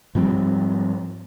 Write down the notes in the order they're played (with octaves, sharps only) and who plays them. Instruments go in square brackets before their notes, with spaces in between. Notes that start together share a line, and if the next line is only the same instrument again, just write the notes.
[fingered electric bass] G#2 F3 G3 C4